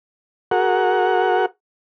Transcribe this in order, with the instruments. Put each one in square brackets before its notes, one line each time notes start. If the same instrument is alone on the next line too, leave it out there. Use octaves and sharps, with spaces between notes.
[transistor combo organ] F#4 G#4 A#4 F#5